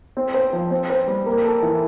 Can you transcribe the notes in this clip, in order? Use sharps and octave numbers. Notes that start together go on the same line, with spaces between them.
C4
C5
F3
C4
C5
G3
A#3
A4
E3